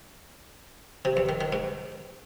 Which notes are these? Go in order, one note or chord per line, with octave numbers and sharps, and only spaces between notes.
C3
E2
D#3
D#3
G#2